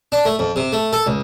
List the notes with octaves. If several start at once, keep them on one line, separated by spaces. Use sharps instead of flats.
D4
A3
F2
C3
A3
A4
C#2